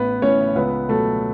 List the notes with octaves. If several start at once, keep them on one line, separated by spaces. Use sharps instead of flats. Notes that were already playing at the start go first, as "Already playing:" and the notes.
Already playing: A1 B3 B4
A2 E3 C#4 C#5
C#2 B3 B4
B2 F#3 A3 A4